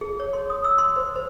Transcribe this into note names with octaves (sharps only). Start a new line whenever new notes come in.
G#4
C#5
C6
D#6
E6
C6
C5
C5